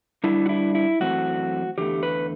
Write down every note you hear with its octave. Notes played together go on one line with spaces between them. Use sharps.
D3 G3 D4 E4
F#4
E4
E4
F#2 E3 A3 C4 F#4
E2 D3 A3 G4
B4